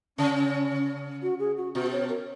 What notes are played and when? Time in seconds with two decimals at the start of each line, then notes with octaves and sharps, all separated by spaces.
0.18 C#3 C#4
1.22 F#4
1.39 G#4
1.57 F#4
1.74 B2 F#4
1.92 C#5
2.09 A#4